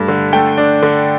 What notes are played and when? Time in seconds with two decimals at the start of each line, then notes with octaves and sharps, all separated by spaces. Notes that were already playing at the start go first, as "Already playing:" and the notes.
Already playing: G2 A3
0.08 D3
0.33 A3 G5
0.58 D4
0.82 D3